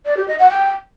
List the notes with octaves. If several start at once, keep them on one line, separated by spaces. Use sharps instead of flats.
D5
G4
D#5
F#5
G5